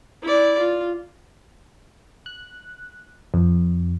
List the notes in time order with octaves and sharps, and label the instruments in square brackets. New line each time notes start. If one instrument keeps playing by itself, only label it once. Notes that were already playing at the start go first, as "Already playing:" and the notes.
[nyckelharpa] E4 D5
F4
[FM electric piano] F#6
F2